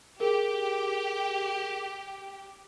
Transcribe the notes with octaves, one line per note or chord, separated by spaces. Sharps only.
G4 G#4 A#4